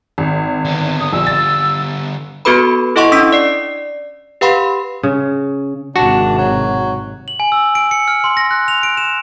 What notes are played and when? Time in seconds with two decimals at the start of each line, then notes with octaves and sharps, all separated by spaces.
0.18 G#1
0.65 D3 B3
1.01 D#6
1.12 A#1 E6
1.27 A6
2.45 B3 F#4 A4 B4 B5
2.96 E4 A4 D#5 F#5 C6 C#6
3.12 C#4 D4 E6 B6 D7
3.33 D5 C7
4.41 G4 B4 F5 F#5 B5 C6
5.03 C#3
5.96 G#1 C3 D4 F#4
6.38 F#3
7.28 F#7
7.40 G#5
7.52 E6
7.75 D7
7.91 C#7
8.08 F6
8.24 C6
8.37 A#6
8.51 F#6
8.68 F7
8.83 D7
8.97 E7